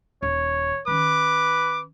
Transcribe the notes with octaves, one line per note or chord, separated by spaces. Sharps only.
D#1 C#5
D#3 C#4 B4 D6